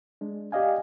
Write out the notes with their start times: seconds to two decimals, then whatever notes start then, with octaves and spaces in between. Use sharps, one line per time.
0.21 G#3 D4
0.52 G4 D5 D#5 F5 G#5